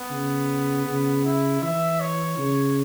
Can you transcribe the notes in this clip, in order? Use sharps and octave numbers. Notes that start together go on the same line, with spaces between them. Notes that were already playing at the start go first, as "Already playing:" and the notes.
Already playing: B3
C#3
C#3
E4
E3 E5
C#5
C#3